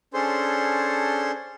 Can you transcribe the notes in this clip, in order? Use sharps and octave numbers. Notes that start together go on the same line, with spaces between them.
C#4 D4 G#4 A4 C5 C6